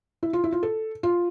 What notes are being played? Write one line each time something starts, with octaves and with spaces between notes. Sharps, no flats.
E4
F4
E4
F4
A4
F4